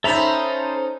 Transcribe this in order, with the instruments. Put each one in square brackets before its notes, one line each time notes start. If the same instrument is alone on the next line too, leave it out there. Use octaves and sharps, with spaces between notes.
[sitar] C#4 D#4 [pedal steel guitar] A4 A#5 B5 [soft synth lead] C5 [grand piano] E5